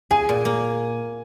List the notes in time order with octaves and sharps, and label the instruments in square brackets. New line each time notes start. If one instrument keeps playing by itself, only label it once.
[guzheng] G#4 [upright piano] G#5
[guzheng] A#2
A#3